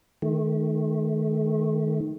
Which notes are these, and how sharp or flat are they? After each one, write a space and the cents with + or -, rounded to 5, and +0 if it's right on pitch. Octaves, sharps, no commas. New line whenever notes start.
D#3 +0 A3 -35